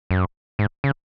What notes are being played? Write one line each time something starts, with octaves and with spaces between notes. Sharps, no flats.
F#2
G#2
C#3